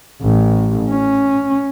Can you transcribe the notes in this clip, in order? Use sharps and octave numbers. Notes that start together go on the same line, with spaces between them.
A1
C#4